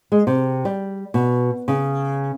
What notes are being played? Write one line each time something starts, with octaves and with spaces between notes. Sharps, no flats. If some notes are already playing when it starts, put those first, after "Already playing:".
G#3
C3
G3
B2
C#3